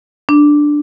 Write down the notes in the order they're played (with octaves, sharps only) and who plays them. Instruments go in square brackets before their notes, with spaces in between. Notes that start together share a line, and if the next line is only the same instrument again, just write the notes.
[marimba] D4